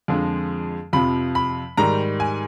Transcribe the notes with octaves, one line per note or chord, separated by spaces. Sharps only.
F2 D3 F3 G#3
F2 C3 F3 B5
B5
G#2 D#3 G3 A#5
G#5